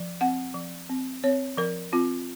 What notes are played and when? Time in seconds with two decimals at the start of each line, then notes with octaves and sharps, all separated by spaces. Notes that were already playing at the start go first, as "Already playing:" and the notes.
Already playing: F3
0.21 C4 F#5
0.55 F3
0.89 C4
1.23 C4 C#5
1.57 F3 A#4
1.93 C4 F4